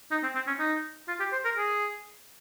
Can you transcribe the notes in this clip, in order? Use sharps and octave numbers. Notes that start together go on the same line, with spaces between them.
D#4
C4
C4
C#4
D#4
F4
G4
C5
A#4
G#4